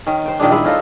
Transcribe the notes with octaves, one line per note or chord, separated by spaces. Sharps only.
D#3 C#4
C5 G5
A#2 D#3 G#3 D4
G#3 E4
C#4 D#4 F4 A4